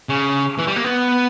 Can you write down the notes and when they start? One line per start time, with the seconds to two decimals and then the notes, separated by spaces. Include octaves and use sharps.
0.09 C#3
0.58 E3
0.67 G3
0.76 A#3
0.84 B3